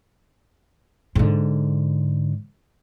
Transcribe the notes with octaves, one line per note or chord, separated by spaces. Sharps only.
G#2 D3